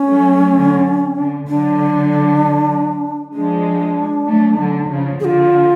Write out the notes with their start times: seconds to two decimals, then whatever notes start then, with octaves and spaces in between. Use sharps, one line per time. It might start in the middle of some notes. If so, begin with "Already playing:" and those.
Already playing: C#4
0.08 F#3 A3
0.55 D3 F#3
1.17 D3
1.48 D3 F#3 D4
3.33 F3 G#3 D4
4.27 F#3 A3
4.58 D3 F#3
4.89 C#3 F3
5.20 D3 G#4
5.25 F4